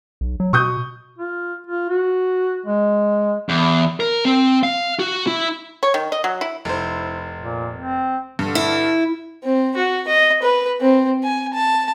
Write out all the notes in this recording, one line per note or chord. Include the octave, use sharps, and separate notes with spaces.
B1
F#3
B2 C#6 D#6 G6
F4
F4
F#4
G#3
E2
A#4
C4
F5
F#4
E4
C#5
D#3
D#5
F#3
E4
F1 E4 C5
A#2
C4
G2 D3
E4
C4
F#4
D#5
B4
C4
G#5
A5